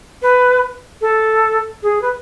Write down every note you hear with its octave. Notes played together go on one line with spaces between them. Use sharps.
B4
A4
G#4
B4